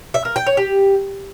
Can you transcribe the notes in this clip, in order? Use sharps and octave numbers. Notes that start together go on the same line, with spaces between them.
E5
A#4
G5
C#5
G4